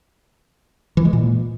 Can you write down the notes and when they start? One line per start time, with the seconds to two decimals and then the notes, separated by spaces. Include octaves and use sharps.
0.97 E3
1.05 G#3
1.13 A#2